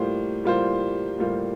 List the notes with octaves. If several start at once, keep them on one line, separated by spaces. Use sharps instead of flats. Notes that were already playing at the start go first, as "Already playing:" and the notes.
Already playing: A2 G3 A#3 F4 C5
A2 G3 A#3 F4 C5
A2 G3 A#3 F4 C5